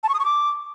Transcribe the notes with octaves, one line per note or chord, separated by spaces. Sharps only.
A5
C#6
D#6
C#6
D6